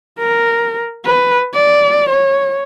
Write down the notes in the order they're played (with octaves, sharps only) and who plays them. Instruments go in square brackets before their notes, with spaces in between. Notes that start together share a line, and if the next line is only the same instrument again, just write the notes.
[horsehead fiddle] A#4
B4
D5
C#5